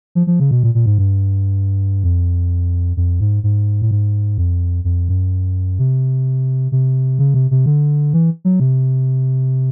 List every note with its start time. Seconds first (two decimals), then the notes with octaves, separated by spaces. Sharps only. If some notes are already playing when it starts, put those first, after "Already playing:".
0.15 F3
0.27 F3
0.40 C#3
0.51 B2
0.63 A#2
0.75 A#2
0.86 G#2
0.98 G2
2.04 F2
2.97 F2
3.21 G#2
3.43 G#2
3.82 A2
3.91 G#2
4.38 F2
4.84 F2
5.09 F#2
5.79 C3
6.72 C3
7.19 C#3
7.34 C3
7.51 C3
7.66 D3
8.13 E3
8.45 F#3
8.60 C3